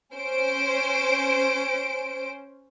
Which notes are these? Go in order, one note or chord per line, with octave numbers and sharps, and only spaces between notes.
C#4 C5 D7